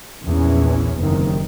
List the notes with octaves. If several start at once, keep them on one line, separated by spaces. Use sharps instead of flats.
A#1 E2 E3 C#4
F#1 C3 D#3